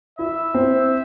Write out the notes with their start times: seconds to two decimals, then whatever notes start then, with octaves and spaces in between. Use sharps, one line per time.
0.19 E4 E5
0.54 C4